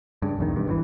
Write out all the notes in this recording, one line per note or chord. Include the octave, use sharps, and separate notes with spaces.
G2 C#3
B1 E2 D#3
G2
G#1 B2 E3